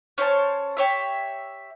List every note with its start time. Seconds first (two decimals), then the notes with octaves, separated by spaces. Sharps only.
0.18 C#4 C5 C#5 A5
0.77 G4 C#5 E5